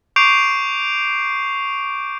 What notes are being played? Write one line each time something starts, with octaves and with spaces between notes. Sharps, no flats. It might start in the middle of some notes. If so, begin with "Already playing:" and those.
C#6 D6 G6 C7 D7 F7